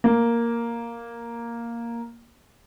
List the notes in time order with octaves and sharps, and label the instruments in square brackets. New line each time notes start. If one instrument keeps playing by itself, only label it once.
[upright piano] A#3